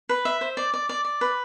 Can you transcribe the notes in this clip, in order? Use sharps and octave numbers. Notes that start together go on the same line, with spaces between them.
B4
E5
C5
D5
D5
D5
D5
B4